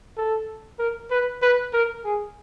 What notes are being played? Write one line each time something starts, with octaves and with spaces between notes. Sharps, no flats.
A4
A#4
B4
B4
A#4
G#4